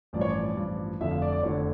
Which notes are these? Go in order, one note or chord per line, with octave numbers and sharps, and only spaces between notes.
A1 G2 F3 D5
C#5
D5
A1 G2 F3
F1 F2 D3 F3 E5
F5
D5
D5
F1 F2 D3 F3 C#5